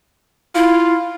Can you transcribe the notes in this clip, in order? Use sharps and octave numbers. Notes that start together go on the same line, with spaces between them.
E4 F4